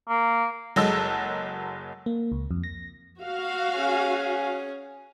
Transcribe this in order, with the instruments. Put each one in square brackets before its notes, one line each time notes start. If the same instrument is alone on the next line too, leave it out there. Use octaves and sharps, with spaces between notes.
[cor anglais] A#3
[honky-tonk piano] F#1 F#3 G#3 A4 A5 E6
[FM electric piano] A#3
C#2
F2
A#6
[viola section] F#4 F5
[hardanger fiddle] C#4 G#4